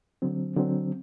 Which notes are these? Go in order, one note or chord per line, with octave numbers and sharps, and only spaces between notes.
D3 F#3 C4
D3 F#3 C4